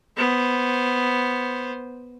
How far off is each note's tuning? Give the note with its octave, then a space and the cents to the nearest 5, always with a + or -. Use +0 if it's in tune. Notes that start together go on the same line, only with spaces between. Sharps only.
B3 +0 C5 +0